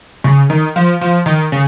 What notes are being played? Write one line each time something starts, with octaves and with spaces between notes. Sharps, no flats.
C#3
D#3
F3
F3
D#3
C#3